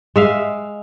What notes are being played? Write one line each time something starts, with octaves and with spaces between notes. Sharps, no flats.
G#3 E5 F5